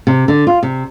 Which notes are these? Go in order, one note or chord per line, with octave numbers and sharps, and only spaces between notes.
C3
D3
F4
C3